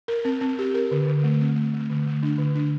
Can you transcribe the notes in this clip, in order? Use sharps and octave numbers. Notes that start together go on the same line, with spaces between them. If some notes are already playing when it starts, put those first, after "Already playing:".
A#4
C4
C4
G4
A#4
D3
D3
A3
C4
A3
A3
D3
A3
D4
D3
D4